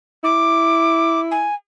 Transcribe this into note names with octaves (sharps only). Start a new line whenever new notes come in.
E4 D6
G#5